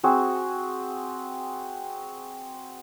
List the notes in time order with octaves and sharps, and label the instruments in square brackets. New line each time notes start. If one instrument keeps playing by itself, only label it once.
[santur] C4 F#4 G#4